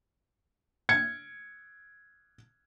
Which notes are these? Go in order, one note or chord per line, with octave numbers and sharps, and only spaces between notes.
G#6 C#7